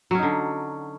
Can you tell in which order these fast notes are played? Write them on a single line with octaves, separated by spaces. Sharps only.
F#3 C#4 D#4 D3